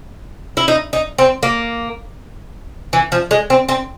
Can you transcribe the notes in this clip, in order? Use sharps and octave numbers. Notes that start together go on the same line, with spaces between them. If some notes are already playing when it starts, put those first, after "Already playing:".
E4
D#4
D#4
C4
A#3
E3
F3
G#3
C4
C4